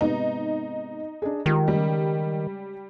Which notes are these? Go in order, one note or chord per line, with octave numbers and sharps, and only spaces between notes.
G#2 C3 B3 D#4
D4 G#4
D#3 G#3 F4 G4
C#3 G3 G#3